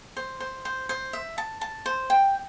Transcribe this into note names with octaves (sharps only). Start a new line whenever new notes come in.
C5
C5
C5
C5
E5
A5
A5
C5
G5